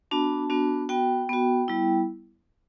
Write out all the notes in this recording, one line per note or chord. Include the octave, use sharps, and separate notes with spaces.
B3 D4 F#4 A5
B3 D4 F#4
B3 F#4 G5
B3 F#4
G3 B3 E4